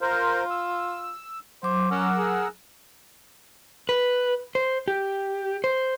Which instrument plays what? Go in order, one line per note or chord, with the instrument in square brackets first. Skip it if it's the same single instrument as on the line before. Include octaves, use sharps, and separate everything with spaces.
[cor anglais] F4 [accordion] A#4 C5
[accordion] E6
[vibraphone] F#3 D6 [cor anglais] C5
[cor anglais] C#4 [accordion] A#4 F#5 E6
[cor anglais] G#4
[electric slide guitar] B4
C5
G4
C5